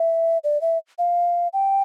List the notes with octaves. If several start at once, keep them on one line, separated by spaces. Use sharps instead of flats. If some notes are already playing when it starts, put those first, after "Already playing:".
Already playing: E5
D5
E5
F5
G5